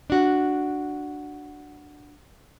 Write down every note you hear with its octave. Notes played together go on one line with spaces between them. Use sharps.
D4 F#4